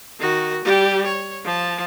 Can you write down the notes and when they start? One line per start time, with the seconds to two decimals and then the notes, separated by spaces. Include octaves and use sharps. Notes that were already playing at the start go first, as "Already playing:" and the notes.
0.19 D#3 F#4
0.65 G3 G4
1.06 C#5
1.44 F3 A5